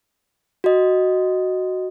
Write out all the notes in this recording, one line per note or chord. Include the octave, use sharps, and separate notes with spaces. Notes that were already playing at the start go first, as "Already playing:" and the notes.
F#4 D#5